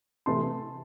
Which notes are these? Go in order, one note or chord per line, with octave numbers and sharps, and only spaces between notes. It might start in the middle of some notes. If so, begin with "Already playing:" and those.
C3 E3 A3 A5 C6